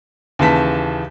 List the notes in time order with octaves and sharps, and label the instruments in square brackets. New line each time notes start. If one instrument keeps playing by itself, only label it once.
[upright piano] D#2 C#3 E3 A5 B6